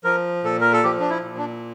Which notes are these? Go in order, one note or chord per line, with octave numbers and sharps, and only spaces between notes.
F3 A#4
A#2 A4
A#4
A4
F3 G4
D4
E4
A#2
D4